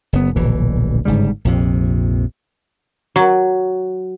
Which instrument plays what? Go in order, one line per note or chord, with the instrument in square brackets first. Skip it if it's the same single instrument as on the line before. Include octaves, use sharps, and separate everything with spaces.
[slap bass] F#1 B3
D1 A#1 B2 E3
G1 G#2 C#3 G3
A#1 F2 C3
[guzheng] F#3